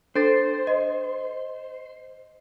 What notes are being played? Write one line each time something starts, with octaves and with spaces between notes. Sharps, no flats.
D4 A4 C5 A6
D#5